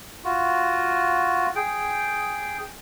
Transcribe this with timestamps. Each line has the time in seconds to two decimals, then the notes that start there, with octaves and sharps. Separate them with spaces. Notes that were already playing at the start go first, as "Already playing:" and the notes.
0.24 F4 F#4
1.55 G#4 G5